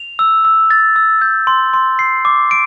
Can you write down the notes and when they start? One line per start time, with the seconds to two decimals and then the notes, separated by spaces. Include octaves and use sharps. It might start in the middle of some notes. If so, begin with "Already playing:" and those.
Already playing: F7
0.19 E6
0.45 E6
0.70 A6
0.96 E6
1.22 G6
1.47 C6
1.74 C6
1.99 C7
2.25 D6
2.51 D7